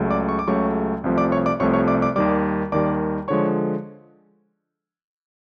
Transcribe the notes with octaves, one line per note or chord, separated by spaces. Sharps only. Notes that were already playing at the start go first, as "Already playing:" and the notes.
Already playing: C#2 C#3 F#3 A3
D5 D6
C#6
D6
C#2 C#3 F#3 A3 C#5 C#6
C2 C3 F3 A3
D5 D6
C#5 C#6
D5 D6
C2 C3 F3 A3 C#5 C#6
C#5 C#6
D5 D6
D5 D6
D#2 D#3 G3 D5 D6
D#2 D#3 G3 D5 D6
D3 F3 G#3 C#5 C#6